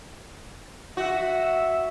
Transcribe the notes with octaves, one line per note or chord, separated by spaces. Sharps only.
F#4 E5